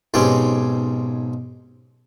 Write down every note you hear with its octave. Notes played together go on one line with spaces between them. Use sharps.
B1 G#2 C4 C#4 G4